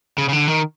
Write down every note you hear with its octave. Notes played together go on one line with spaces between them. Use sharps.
C#3
C#3
D3
D#3